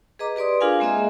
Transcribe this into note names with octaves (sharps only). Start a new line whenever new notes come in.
G#4 B4 D#5 A#5 D6
G4 B4 D5 C6 D#6
D4 F4 G#4 A#4 F5 G#5
G#3 A#3 C4 G#4 D#5 E5